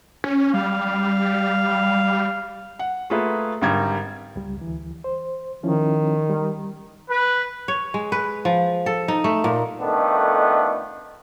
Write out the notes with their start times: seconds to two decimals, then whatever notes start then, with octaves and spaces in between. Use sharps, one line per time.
0.24 C#4
0.54 G3 F5
2.79 F#5
3.10 A3 A#3 F4 G#4 B4
3.62 G#1 D3 G3 A#4 G#6
4.36 C#2 G3
4.57 D2 E3
5.04 C5
5.63 D#3 F3 C#4 E4
6.30 G3
7.07 B4
7.68 C#5
7.94 G#3
8.12 B4
8.45 F3
8.86 A4
9.08 D#4
9.24 A3
9.44 A#2
9.81 F2 D#3 A3 B3 D4